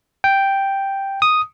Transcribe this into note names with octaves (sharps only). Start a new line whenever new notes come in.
G5
D#6